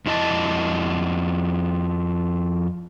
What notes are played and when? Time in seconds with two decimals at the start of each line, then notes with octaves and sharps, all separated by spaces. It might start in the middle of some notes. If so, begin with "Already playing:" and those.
0.06 F2 E4 D#5 A5